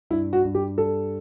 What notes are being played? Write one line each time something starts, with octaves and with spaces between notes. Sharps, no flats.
G2 E4
F#4
G2
G4
G3 A4